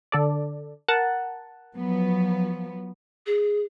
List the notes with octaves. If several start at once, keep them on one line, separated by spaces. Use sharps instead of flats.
D3 A4 D5
A#4 F#5 A5
F3 F#3 B3
G#4